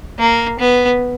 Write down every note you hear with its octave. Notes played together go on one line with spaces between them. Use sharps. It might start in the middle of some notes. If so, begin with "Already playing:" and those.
A#3
B3